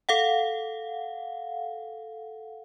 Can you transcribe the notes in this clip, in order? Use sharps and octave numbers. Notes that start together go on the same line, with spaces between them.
A4 F5 F#5